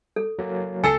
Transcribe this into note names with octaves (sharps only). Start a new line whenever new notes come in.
A4
F#3 A#3
C#2 A4 G#5 A5 E6 C7 C#7